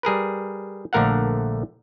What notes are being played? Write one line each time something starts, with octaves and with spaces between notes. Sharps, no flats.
G3 G#4 A#4 B4
A#1 D3 A3 A#4 F5 F#5